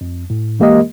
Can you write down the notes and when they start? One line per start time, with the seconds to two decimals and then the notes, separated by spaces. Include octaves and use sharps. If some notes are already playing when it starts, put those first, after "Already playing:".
0.01 F2
0.30 A2
0.59 E3 G#3 A#3 G4 A#4 D#5